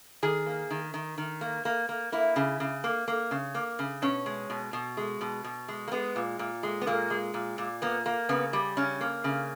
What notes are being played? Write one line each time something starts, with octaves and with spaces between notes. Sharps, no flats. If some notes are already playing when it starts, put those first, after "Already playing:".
D#3 G#4
A#3
D#3
D#3
D#3
A#3
A#3
A#3
A#3 E4
C#3
C#3
A#3
A#3
C#3
A#3
C#3
B2 C#4
G#3
B2
B2
G#3
B2
B2
G#3
A#3
G#3 B3
A#2
A#2
G#3
B3
A#2 A#3
G#3
A#2
A#2
A#3 B3
A#3
C#3 B3
G3
C#3 C#4
A#3
C#3